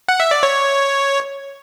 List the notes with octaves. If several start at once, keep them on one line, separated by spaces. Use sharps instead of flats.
F#5
E5
D5
C#5